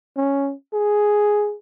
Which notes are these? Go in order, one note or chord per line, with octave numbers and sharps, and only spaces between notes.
C#4
G#4